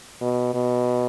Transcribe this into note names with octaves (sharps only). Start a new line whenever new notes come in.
B2
B2